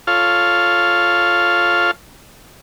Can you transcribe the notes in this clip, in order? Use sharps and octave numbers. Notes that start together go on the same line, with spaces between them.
F4 A4 C#5 F5